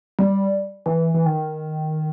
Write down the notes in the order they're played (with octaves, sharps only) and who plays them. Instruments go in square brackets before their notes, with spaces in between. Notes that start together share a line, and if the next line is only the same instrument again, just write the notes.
[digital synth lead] G3
E3
E3
D#3